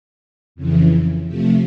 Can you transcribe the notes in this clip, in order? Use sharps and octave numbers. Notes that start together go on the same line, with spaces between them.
F2 C#3 E3
C3 F3 A3